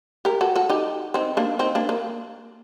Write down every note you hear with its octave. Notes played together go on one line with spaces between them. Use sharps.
G4 A#4
F#4 A4
F#4 A4
D#4 G4
C4 D#4
A#3 D4
C4 D#4
A#3 D4
A#3